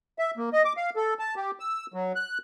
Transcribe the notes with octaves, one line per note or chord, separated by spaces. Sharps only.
E5
A#3
D#5
D6
F5
A4
A5
G4
E6
F#3
F#6